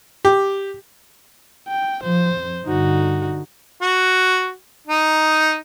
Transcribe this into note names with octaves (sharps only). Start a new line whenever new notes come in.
G4
G5
F3 C5
F2
G2 D3 D#4 F#4
F#4
D#4